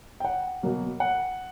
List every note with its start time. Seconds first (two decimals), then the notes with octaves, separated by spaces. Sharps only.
0.20 G5
0.25 F#5
0.63 B2 F#3 A#3
1.00 F#5